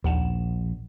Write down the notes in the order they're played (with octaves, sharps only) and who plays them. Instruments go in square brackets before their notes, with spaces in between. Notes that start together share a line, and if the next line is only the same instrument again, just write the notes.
[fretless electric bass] A#1 [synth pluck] D#2 F#5 E7